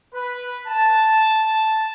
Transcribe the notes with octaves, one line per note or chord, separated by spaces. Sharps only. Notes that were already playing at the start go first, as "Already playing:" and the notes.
B4
A5